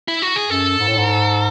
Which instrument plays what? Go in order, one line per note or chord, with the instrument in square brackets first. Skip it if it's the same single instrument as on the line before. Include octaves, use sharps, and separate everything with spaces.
[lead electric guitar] E4
F#4
G#4
[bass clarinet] F#2 [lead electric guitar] A4
[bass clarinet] G#2
A2
G#2